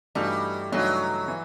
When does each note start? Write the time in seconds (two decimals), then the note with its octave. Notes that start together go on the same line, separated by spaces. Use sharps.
0.15 G2 E3 G3 A3 D#4 F#4
0.72 G2 E3 F#3 A3 D#4 F#4
1.28 E3